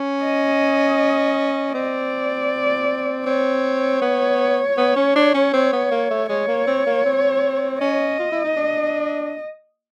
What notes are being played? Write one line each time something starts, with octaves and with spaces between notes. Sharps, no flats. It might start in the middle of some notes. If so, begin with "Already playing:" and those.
Already playing: C#4
D#5
C4 D5
C4 C#5
B3
B3
C#4
D4
C#4
C4
B3
A#3
A3
G#3 C#5
A#3
C4
A#3
C4
C#4 D#5
F4
E4
D#4
D4